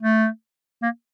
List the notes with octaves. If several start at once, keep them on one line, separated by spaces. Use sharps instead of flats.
A3
A#3